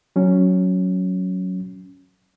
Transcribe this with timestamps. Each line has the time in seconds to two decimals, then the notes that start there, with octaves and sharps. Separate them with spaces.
0.16 F#3 C#4